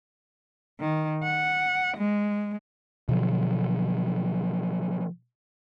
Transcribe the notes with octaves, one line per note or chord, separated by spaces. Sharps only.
D#3
F#5
G#3
B2 D3 F3 F#3